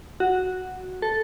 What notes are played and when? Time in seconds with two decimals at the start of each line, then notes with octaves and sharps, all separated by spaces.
0.20 F#4
1.02 A4